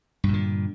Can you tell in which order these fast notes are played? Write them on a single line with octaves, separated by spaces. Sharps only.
G2 A#2 D3